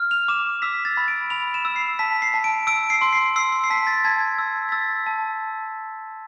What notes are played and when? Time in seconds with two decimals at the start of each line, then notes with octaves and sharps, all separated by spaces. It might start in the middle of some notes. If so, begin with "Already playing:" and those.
Already playing: F6
0.11 F7
0.28 D6 E7
0.62 E6 B6
0.85 A6
0.97 B5
1.08 D7
1.30 B5 F7
1.54 E7
1.65 E6
1.76 C7
1.99 A5 B6
2.22 C7
2.34 A5
2.44 D7
2.67 E6 D7
2.90 C7
3.01 C6
3.13 C7
3.36 E6 C7
3.52 C7
3.64 C7
3.70 A5 B6
3.87 A6
4.05 A5 G#6
4.38 E6
4.69 B6
4.72 E6 A6
5.07 A5